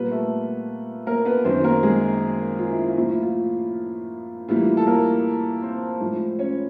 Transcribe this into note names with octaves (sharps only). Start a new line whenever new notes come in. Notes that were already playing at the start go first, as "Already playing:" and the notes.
Already playing: A#2 G3 A#3 B3 B4
A3 A4
A#3 A#4
B3 B4
F#2 D#3 F#3 C4 C5
A#3 A#4
G#3 G#4
F4
E4
F4
A2 F3 A#3 E4
E4
F4
A2 E3 G3 A#3 F4
A4
A#3 A#4
C4 C5
A2 F3 G#3
C#4 C#5